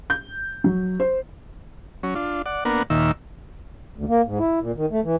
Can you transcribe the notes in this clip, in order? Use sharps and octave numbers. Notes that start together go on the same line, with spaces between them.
G6
F#3
C5
F#3 C#4
D4 F4
D5 F#5
A#3 B3 D4 A#4 F#5
D#2 A#2 D#3 E5 E6
D2
A#3
G#2
E4
A#2
D#3
A3
E3